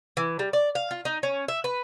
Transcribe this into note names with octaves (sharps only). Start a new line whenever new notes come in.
E3
G3
D5
F5
F4
D#4
C#4
E5
B4